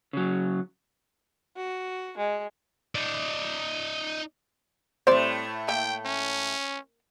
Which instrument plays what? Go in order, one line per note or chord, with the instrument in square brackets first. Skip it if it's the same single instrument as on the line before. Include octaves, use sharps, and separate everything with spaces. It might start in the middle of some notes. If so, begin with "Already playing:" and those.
[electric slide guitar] C#3 F#3
[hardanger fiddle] F#4
G#3
[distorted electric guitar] D#4 D5
[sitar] A2 A3 [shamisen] G3 C4 D5 [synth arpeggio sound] C5
[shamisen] A#3 E4 [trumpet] G5
[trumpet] C#4